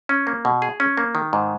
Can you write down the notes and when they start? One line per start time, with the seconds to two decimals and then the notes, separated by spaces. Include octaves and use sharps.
0.09 C#4
0.27 A#3
0.45 B2
0.62 G#4
0.80 C#4
0.97 A#3
1.15 D#3
1.33 G#2